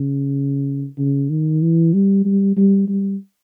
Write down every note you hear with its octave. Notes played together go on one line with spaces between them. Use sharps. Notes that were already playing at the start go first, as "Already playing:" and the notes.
Already playing: C#3
C#3
D#3
E3
G3
G3
G3
G3